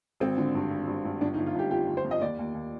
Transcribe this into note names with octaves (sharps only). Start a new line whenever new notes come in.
G#1 C4
D3
G2
G#1
G2
G2
G1 D4
D#4
G1
F4
G1 G4
F2 G4
G1
C5
F2
D#5
D#2 D5
D#2
D#2